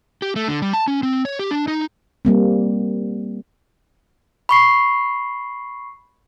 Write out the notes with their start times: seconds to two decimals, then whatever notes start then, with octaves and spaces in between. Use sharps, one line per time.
0.22 G4
0.36 A3
0.48 D3
0.62 G3
0.73 A5
0.88 C#4
1.03 C4
1.25 C#5
1.39 G4
1.51 D4
1.68 D#4
2.25 G3 A#3 C4
4.49 B5 C#6 C7